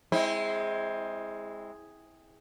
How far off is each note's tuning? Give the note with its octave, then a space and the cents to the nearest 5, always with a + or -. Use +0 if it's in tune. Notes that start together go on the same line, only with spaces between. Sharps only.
G#3 +0 C4 +15 E4 -25